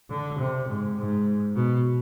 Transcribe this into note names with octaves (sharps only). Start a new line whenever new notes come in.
D3
C3
G#2
G#2
B2